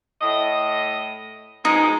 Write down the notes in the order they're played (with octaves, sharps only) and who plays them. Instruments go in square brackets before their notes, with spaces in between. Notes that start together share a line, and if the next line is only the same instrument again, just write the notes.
[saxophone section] A2 D#5
[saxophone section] B2 F3 G#3 [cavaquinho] D#4